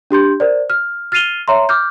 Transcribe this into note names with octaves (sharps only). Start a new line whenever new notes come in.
D4 G4 C6 G6
A#4 C5 D5
F6
F6 A6 C7 D#7 F7 G7
C#5 E5 A#5 C6
D6 F6 G6